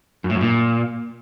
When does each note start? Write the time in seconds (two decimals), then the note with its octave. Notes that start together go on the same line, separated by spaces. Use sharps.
0.24 F#2
0.30 A2
0.35 F#2
0.41 A#2